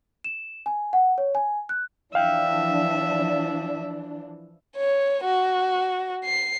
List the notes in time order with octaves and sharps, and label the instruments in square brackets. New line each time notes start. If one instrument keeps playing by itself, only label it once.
[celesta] E7
G#5
F#5
C#5
G#5
F#6
[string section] E3 F3 D4 [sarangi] E5 [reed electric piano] F5 G5
[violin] C#5
F#4
C7